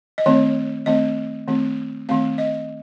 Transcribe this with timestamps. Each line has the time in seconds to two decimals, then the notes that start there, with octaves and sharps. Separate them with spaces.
0.18 D#5
0.26 D#3 A3 C4 C#5
0.86 D#3 A3 C4 D#5
1.48 D#3 A3 C4
2.09 D#3 A3 C4 F5
2.38 D#5